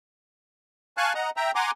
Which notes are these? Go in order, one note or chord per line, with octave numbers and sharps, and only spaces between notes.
F5 G#5 A5 C#6 F#6
D#5 F#5 A#5
E5 G5 A#5
F#5 G#5 A#5 C6 D6